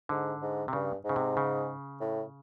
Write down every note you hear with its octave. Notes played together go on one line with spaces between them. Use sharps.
G#2 D3
G#2
C3
G2 C#3
G#2 C#3
C3
C#3
A2